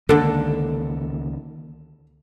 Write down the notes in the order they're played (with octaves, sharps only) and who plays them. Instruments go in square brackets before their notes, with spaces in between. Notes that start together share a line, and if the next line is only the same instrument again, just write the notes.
[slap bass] C#2 D#3 A#3 [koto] D3 D4 [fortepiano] A4